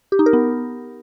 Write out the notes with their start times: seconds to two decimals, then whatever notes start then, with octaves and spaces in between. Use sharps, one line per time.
0.12 G4
0.19 D#4
0.26 A#4
0.33 B3